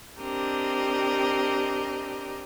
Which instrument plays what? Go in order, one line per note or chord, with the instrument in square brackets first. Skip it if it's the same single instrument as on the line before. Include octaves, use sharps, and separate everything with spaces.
[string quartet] C4 D4 G4 A#4 D#5